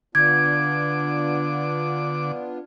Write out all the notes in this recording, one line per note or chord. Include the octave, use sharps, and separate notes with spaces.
D3 B3 D4 F4 D6 G#6